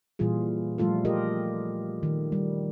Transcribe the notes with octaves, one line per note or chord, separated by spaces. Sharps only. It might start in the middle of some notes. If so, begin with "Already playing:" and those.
A#2 E3 G3 F4 G#4
F3 G3 A3 F4 A4
F4 G4 A#4 D#5
D#3
G3